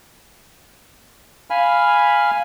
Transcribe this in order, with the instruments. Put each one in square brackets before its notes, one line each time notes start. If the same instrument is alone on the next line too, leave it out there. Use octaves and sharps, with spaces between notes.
[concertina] F5 G#5 B5 F6